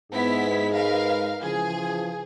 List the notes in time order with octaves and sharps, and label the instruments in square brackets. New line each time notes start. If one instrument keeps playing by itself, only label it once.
[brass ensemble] G#2 G#3 [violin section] B3 E4 B6
[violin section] A#4 B4 F5
[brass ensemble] C#3 E3 F3 [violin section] G#4